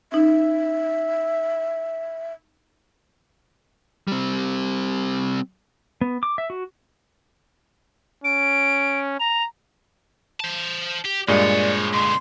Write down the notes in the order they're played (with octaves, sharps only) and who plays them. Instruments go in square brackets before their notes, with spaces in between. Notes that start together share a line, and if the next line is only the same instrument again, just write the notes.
[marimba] C#4 D#4 [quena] E5
[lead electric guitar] G3 C4
[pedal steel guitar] B3
D6
E5
F#4
[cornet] C#4 [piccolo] D7
[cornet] A#5 [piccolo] F7
[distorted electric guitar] C5 A5
G4
[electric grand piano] G2 A#2 G#3 [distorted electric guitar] C4 C#5 [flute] D5
[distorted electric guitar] B2 D3 [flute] C6